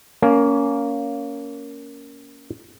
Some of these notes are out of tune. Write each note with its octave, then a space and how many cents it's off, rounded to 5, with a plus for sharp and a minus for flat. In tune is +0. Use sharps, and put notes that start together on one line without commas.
A#3 +0 C#4 +20